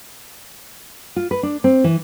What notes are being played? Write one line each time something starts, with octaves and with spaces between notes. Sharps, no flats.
F4
B4
D4
C4
E3